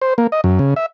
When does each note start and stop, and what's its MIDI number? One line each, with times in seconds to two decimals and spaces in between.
0.02 0.14 72
0.18 0.27 58
0.32 0.41 75
0.44 0.59 42
0.59 0.74 49
0.76 0.86 76